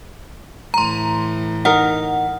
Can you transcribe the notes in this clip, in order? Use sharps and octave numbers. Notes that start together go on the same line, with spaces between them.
A2 E3 A#5 C6
D#4 A#4 F#5